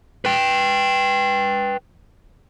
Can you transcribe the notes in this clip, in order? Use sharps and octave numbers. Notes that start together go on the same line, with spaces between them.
B4 G5